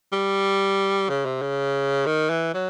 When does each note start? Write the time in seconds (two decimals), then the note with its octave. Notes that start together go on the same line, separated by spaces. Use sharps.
0.12 G3
1.09 C#3
1.25 C3
1.42 C#3
2.06 D#3
2.30 E3
2.54 F#3